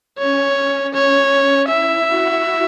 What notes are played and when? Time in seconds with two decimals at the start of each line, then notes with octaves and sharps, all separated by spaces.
0.19 C#4 C#5
0.94 C#4 C#5
1.69 E4 E5
2.07 F#4